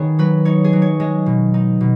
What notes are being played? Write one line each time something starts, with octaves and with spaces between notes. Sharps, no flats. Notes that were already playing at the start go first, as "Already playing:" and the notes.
Already playing: D#3 B3 D#4 G#4 C#5
F#3 B4
D#4 C#5
G#4
F#3
C#5
G#3 D#5
B2
D#4
B2